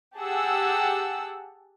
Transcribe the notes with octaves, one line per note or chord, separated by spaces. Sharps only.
G4 G#4 F#5 A5 E6